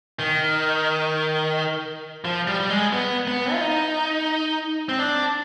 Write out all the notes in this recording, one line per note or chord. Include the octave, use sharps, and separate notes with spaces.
D#3
F3
G3
G3
G#3
B3
B3
F4
D#4
C4
D4